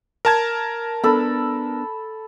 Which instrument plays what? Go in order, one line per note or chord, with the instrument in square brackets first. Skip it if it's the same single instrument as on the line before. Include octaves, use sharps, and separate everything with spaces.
[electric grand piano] A#4 A5 G#6
[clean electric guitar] B3 D4 [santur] A4 B5